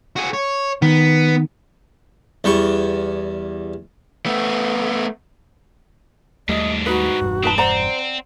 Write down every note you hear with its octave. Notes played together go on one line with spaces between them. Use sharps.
F#4 G#4
C#5
D#3 B3
E2 G3 C#6
A3 B3
D#2 G#2 G3 A3 D4 D#5
D#4 F#4 B4
E1 G2
C4 D#4 B4 A5
C5 D5 F#5 A#5